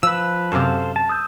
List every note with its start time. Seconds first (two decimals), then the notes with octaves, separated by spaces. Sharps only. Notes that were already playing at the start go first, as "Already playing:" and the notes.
0.03 F3 B4 E6
0.52 F#2 C3 A4 C5 F5
0.96 A5
1.09 D#6 E6 G6